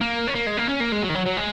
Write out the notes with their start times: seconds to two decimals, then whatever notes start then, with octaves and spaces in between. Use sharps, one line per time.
0.01 A#3
0.27 C#4
0.35 A#3
0.47 G#3
0.58 A#3
0.69 C#4
0.81 A#3
0.92 G#3
1.03 F#3
1.09 D#3
1.15 F#3
1.26 F#3
1.37 G#3